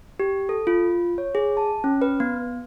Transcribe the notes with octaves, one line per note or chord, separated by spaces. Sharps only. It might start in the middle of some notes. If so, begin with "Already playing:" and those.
G4
A4
F4
C#5
G#4
A5
C#4
B4
B3